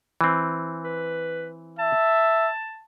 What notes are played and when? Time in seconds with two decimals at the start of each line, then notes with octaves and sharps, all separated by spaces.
0.21 E3 C4
0.85 B4
1.79 E5 A5